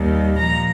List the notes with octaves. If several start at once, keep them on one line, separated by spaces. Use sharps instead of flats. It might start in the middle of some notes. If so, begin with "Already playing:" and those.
Already playing: D#2 D#3 G3
A#2 F3 A#5